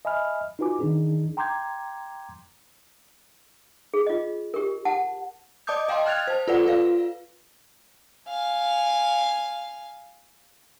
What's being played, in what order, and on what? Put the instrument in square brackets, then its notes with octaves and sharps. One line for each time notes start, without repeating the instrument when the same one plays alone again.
[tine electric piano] D#5 E5 G#5 B5 F6
D#4 F4 F#4 B4 G#5 D6
D#3 E3 D4 D#4 G#4
G5 A#5 C6 D6 G6 G#6
[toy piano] G#4
F4 D#5
G4 A#4
F#5 A5
[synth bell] D5 D#5 A5 D6 D#6 G6
D#5 F5 G5 A5 C6
G5 F6 F#6 G#6 A6 F7
C5 A5
F4 A4 B4 D5 F#5
F4 B4 F5
[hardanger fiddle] F5 G#5